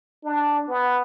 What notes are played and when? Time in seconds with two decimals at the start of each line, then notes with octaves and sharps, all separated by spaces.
0.24 D4
0.68 B3